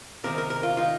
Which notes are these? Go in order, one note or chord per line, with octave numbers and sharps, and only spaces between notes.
C3 D#3 C4 D#4 A#4
A#4
A#4
F4
D#3 A#3 D#4 F4